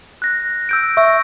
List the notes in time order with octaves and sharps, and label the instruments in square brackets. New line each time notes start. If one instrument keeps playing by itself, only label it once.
[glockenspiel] F#6 A#6
E6 G6 D7
[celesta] E5 [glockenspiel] C#6 E6 A#6